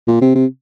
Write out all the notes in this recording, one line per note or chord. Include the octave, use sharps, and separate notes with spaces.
A#2
C3
C3